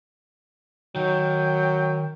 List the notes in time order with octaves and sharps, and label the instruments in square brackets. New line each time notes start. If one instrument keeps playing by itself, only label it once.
[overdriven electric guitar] D#3 [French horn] F#3 [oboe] G5